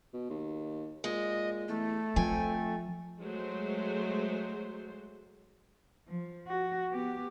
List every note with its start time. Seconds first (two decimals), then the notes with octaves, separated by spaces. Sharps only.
0.14 B2
0.30 D#2
1.04 A#2 G#3 D#5
1.68 E2 A3
2.16 F2 F3 G5 G#5
3.21 F#3 G#3 A3 C5
6.07 F3
6.47 F#4
6.91 B3 G4